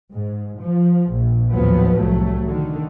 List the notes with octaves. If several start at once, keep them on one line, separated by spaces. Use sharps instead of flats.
G#2
F3
A#1
D#2 A2 F3 F#3 B3
C2 F#3 A3
D3 D#3